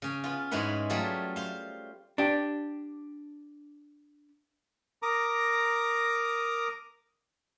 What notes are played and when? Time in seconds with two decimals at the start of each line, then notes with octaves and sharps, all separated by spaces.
0.02 C#3 C#4
0.24 B3 F4
0.51 G#2 G#3 C#4 E4 B4 F#5
0.90 F#3 G3 A3 F4 G#4 E5
1.36 C5 F5
2.18 D4 G4
5.03 A#4 A#5 D6 D#6